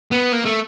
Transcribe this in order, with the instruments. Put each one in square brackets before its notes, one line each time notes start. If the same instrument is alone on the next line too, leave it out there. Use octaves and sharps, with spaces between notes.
[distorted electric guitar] B3
A#3
A3